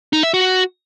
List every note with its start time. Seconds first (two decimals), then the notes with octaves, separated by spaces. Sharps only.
0.13 D#4
0.23 E5
0.34 F#4